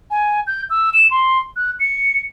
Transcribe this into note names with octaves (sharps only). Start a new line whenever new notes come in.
G#5
G6
E6
E7
C6
F#6
C#7